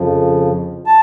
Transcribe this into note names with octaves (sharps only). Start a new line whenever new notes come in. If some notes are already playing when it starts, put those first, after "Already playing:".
Already playing: F2 C#3 F3
A5